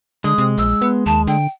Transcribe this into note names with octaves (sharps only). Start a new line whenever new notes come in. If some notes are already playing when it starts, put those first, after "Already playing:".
D3 G#3 D#6
C3
A#1 E6
B3
D#2 A5
D3 G5